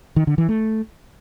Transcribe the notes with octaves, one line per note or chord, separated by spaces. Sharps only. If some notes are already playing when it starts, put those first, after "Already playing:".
D#3
D3
E3
A3